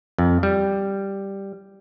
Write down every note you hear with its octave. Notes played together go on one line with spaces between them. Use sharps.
F2
G3